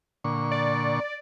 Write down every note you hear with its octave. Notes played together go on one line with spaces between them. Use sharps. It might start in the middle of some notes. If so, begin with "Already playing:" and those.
A#2 D3 C#6
D5